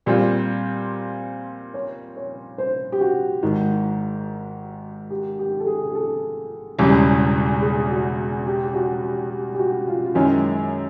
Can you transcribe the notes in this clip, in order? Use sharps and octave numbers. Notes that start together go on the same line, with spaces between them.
A#2 G3 C4 F4 D5
C#5
C#5
C5
G4
F#4
G#1 G#2 D#3
G4
G4
A4
G#4
G#4
A4
E1 E2 C#3 E3 G3
G#4
F#4
G4
G4
F#4
G4
G4
G4
F#4
F4
F4
F#2 D#3 G#3 C#4 E4